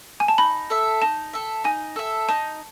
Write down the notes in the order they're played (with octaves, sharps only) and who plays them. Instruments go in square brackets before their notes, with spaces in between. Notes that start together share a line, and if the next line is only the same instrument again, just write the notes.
[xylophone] G#5
A5
[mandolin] D#4 [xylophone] B5
[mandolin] A4 E5
[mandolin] D#4 [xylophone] A5
[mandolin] A4 E5
[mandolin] D#4 [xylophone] G#5
[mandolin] A4 E5
[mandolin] D#4 [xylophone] A5